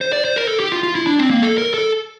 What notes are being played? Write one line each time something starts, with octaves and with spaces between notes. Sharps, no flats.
C5
D5
C5
A#4
A4
G4
F4
F4
E4
D4
C4
A#3
A4
A#4
A4